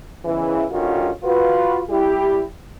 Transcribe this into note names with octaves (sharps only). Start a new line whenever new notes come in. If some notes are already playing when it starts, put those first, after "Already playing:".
E2 G#2 C#3 E3
D3 D#3 G3 C#4 F4 F#4
F4 F#4 B4
G3 E4 G4